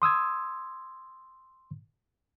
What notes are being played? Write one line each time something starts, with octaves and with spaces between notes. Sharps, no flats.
C6 D#6 E6 G#6